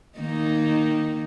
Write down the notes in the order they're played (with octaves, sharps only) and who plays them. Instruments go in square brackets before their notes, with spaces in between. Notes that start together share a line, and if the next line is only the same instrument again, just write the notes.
[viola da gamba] D#3 A#3 D#4